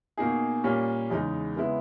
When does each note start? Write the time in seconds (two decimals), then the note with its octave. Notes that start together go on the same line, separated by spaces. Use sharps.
0.17 B2 A#3 D#4 G#4
0.64 A#2 G3 A#3 C#4
1.10 E2 C#3 G#3 D#4
1.57 C#3 G#3 B3 E4